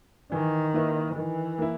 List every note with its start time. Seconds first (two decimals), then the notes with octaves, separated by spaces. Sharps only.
0.32 D#3 E3
0.74 A#3 E4 B4 D#5
1.16 D#3 E3
1.58 A#3 E4